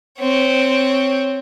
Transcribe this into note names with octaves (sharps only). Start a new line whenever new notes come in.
C4 C#5